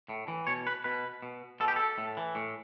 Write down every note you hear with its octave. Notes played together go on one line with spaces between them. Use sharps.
A2
E3
B2 C#5
B4
B2 B4
B2
B2 A4
G4
A4
A2
E3
A2